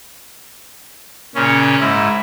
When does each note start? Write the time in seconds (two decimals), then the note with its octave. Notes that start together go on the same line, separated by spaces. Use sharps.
1.35 A#2 C#3 C#4
1.80 G#2 E4